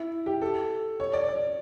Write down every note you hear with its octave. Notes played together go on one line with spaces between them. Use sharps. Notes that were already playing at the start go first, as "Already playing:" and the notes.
Already playing: E4
G4
A4
C#5
D5
D5